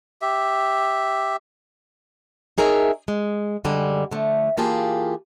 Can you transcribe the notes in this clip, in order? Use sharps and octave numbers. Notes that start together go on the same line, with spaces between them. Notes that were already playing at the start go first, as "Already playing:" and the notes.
G4 E5
D#4 G#4 A#4 C#5 E5
G#3
F#2 D3 G3 G#3
D3 F3 A3
E3 A#3 F4 G4 G#4 A5